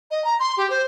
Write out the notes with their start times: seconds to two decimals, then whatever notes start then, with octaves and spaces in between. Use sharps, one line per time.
0.10 D#5
0.24 A#5
0.39 C6
0.57 G4
0.70 C5